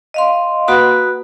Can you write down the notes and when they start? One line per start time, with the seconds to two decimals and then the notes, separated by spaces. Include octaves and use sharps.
0.14 D#5 F5 C6
0.68 A#3 F#4 B4 F#5 B5 D#6